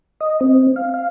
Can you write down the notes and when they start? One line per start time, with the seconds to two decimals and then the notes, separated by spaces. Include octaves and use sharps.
0.21 D#5
0.41 C4
0.76 F5
0.94 F5